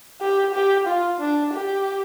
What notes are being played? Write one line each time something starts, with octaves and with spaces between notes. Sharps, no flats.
G4
G4
F4
D4
G4